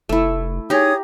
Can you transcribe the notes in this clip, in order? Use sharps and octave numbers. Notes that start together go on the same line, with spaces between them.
F1 A3 E4
D#4 G4 G#4 C#5 A#5 D#6